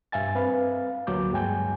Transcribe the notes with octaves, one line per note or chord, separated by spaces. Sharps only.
G2 E5 F5 G#5 A6
C4 B4 F5
D2 F#3 A#3 D6 G6
G2 G#3 G5 G#5 G6